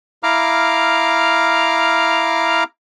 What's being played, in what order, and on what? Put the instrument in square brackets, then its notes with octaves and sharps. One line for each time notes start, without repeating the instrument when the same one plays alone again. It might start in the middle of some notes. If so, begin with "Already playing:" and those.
[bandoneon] E4 F5 A#5 D6 F6